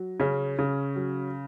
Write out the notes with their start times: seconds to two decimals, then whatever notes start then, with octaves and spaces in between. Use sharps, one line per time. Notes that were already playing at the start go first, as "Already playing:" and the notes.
Already playing: F#3
0.20 C#3 C#4
0.59 C#3
0.96 F#3